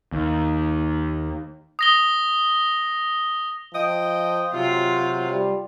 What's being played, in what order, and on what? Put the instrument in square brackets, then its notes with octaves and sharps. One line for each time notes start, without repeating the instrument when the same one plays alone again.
[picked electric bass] D#2
[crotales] D#6 A#6 G7
[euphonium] F3 [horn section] D#5 G5
[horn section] C3 [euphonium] F#3 [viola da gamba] F4
[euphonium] G3